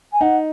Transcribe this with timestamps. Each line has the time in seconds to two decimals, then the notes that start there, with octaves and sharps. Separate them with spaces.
0.12 G#5
0.21 D#4 F#5